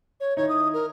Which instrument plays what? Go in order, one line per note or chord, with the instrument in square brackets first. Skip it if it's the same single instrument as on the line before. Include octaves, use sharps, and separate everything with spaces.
[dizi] C#5
[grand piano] D#3 D#4 E4 [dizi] C#5
[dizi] D#6
A#4